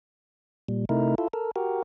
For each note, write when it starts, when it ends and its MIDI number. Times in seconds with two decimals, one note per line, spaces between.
0.69 0.85 46
0.69 0.85 55
0.89 1.15 48
0.89 1.15 57
0.89 1.15 63
0.89 1.15 64
0.89 1.15 70
1.18 1.28 64
1.18 1.28 65
1.18 1.28 69
1.33 1.51 69
1.33 1.51 70
1.56 1.83 66
1.56 1.83 67
1.56 1.83 70